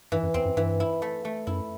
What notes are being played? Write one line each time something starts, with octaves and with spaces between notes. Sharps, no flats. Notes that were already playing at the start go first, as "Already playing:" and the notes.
G2 E3
F#2
E2 C4
F#2
G2 E3
E4
A3
A3
F#2 E4